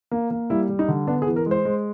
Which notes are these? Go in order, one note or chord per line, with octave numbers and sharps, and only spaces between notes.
A#3
A#3
G3 E4
G3
D#4
D3
B3 D4
G#4
E3
A#4
G#3
C5
G#3